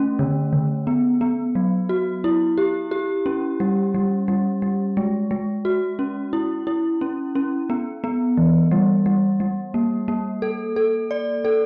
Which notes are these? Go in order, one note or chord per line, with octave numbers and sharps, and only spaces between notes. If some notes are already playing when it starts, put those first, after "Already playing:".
Already playing: A3 C#4
D3
D3
B3
B3
F#3
F#4
E4
G4
G4
C#4
G3
G3
G3
G3
G#3
G#3
F#4
C#4
E4
E4
C#4
C#4
B3
B3
E3
G3
G3
G3
A#3
A#3
A4
A4
D5
A4